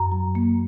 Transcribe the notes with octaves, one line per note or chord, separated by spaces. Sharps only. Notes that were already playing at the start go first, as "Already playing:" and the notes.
Already playing: F#2 A#5
F#3
A#3